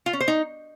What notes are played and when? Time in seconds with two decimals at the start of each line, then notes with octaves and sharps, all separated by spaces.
0.06 F4
0.13 C#4
0.21 C5
0.28 D#4